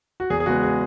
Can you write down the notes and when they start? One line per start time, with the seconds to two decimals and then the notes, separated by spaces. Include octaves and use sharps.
0.20 F#4
0.30 E2 G#4
0.40 G#4
0.46 C#3 G#3 B3 F#4
0.63 G#4